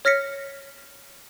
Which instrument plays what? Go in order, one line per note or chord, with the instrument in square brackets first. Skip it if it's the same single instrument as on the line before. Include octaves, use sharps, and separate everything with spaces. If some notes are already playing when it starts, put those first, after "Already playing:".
[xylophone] C#5 F6 A#6 B6 C#7